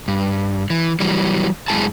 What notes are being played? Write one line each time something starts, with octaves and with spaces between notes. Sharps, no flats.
G2
E3
E3 F#3 G3
F#2 G#3 E4 G#4 A5